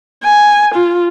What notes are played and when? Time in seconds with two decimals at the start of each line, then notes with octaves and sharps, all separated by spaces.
0.24 G#5
0.74 F4